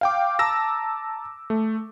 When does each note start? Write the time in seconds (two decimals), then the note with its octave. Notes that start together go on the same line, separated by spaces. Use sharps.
0.01 F5 G5 D6
0.39 A5 A#5 D6 E6 A#6
1.50 A3